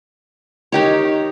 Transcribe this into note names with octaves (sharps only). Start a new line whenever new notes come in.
D#3 D#4 G4 C#5